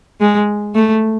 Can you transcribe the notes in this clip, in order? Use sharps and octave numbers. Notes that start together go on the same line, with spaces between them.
G#3
A3